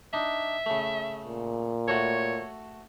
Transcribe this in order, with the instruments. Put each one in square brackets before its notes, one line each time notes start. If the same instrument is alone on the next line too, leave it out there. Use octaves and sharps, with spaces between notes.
[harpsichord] D4 D#4 [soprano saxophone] E5
[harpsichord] C#3 A3
[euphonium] A#2
[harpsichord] A3 F#4 A4 [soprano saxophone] C#5